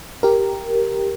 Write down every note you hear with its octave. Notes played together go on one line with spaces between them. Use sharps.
G4 A#4